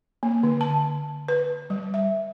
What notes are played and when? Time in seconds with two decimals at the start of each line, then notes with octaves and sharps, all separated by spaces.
0.23 A#3
0.43 D3
0.61 A5
1.28 B4
1.70 G3
1.94 E5